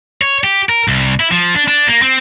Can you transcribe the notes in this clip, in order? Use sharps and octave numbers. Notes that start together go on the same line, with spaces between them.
C#5
G4
A#4
C2
E4
F3
D4
D4
A#3
C4